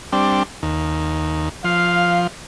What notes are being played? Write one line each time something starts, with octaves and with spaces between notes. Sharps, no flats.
G3 C4 D4
D#2
F3 F5